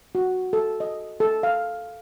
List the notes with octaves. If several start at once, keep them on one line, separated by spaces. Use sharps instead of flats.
F#4
A4
D#5
A4
F5